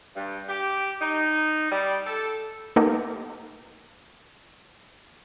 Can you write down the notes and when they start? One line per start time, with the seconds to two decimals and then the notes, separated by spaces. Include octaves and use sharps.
0.16 G2
0.49 G4
1.02 D#4
1.72 G3
2.06 A4
2.76 A#3 B3 D#4 G4 A4